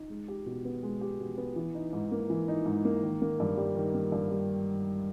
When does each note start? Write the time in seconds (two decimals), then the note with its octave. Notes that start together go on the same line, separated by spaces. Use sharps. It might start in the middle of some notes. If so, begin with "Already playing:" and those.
Already playing: D#4
0.10 G#3
0.28 G4
0.46 B2
0.65 B3
0.83 G#3
1.01 G4
1.20 B2
1.38 B3
1.56 E3
1.75 D#4
1.93 G#2
2.12 A#3
2.30 E3
2.48 D#4
2.66 G#2
2.85 A#3
3.03 D#3
3.22 A#3
3.40 G2
3.57 G3
3.76 D#3
3.94 A#3
4.12 G2
4.31 G3